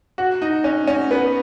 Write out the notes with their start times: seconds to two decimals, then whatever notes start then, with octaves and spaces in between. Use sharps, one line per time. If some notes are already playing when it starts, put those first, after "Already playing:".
0.18 F#4
0.42 D#4
0.64 C#4
0.87 C#4
1.11 B3